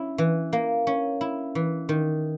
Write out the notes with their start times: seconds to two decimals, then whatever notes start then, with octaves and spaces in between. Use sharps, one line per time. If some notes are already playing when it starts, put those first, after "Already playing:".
Already playing: C#4 E4
0.18 E3
0.53 A#3
0.87 C#4
1.21 E4
1.55 E3
1.89 D#3